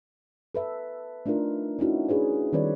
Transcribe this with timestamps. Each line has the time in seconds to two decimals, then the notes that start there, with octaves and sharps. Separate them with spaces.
0.55 A4 B4 E5
1.26 A3 D4 D#4 F4 A#4
1.79 C#4 D#4 E4 F#4
2.09 D4 G#4 B4 C#5
2.53 D#3 G3 C4 B4 C#5 D5